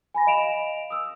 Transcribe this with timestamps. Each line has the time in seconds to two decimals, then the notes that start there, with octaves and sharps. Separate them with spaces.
0.14 G#5 B5 A#6
0.27 D#5 F5 D7 E7 F7
0.90 D#6 E6